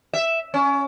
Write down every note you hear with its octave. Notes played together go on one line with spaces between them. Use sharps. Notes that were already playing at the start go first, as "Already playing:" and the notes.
E5
C#4